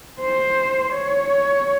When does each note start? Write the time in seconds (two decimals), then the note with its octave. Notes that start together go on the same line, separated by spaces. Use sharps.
0.21 C5
0.93 C#5